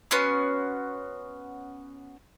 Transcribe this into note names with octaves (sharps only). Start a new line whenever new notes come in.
B3 C#4 F#4 C6